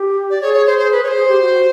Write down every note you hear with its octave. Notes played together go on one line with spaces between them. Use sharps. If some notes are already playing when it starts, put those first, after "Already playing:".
Already playing: G4
D5
G#4 C#5
C#5
C5
C5
B4
C#5
C5
G#4
G4
F#4
F#4